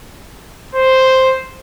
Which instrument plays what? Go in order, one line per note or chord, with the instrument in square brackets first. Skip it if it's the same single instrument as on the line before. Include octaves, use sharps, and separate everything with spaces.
[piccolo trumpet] C5